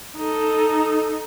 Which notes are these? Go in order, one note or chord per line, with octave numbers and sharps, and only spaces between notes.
D#4 A4